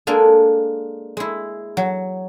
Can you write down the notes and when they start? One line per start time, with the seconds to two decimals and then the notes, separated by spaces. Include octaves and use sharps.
0.07 G#3 A#3 D4 A4 G#5
1.17 G#3 E4
1.77 F#3